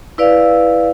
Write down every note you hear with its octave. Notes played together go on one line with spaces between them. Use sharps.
E4 B4 D5 F5